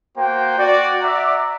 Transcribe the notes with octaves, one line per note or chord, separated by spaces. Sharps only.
A#3 F#4 C5 G5
F#4 D5
D5 E5 F#5 A#5 D6